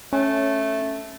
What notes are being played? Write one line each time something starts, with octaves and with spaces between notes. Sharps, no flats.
A3 C#4